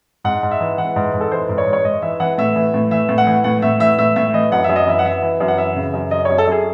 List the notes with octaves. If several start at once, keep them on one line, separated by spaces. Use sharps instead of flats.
G#2 F#5
G#2
E5
E3
E3 F#5
G#2
G#2
A4
E3 C5
G#2
C#5
G#2
C#5
G#2 D#5
E3 E5
E3 F#5
A2 E5
E3
A2
E3 E5
A2
F#5
E3
A2 F#5
A2 E5
E3 E5
A2 E5
A2 E5
E3 D#5
F#2 F#5
E5
F#2
D#5
E3 E5
F#5
E3 E5
E3
F#2
F#5
E3 E5
C#3
F#2
F#2 D#5
F#2 C#5
A4
F#2 G#4